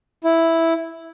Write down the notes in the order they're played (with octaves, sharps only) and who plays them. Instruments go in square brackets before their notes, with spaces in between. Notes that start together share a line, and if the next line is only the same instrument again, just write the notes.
[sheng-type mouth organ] E4